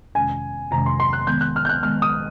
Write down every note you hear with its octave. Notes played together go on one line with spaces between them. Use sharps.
F2 C3 D#3 G#3 C#4 G#5
F2 C3 D#3 G#3 C#4 A#5
C6
C6
F#6
D#3 G#3 B3 G6
F#6
F6
G6
F#6
D#3 G#3 B3 F6
D#6